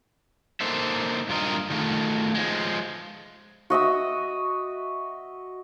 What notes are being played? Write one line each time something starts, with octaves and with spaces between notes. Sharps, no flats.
A#3 D#4 A4 C5 E5
G2 F4 A#4 D#5
D#3 A3 F4
F3 G#3
F#4 D#5 E5 E6